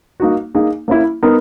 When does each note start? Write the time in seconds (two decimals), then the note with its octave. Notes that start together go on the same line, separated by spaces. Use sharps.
0.20 A#3 D#4 F#4
0.54 A#3 D#4 G#4
0.88 A#3 C#4 E4
1.23 B3 D#4 A#4